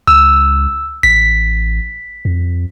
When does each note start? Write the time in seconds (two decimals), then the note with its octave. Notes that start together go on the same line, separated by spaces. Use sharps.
0.07 C#2 E6
1.03 A1 B6
2.25 F2